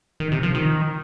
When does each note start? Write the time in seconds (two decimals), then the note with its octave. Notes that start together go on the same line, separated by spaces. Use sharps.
0.20 D#3
0.32 C3
0.43 F3
0.54 D#3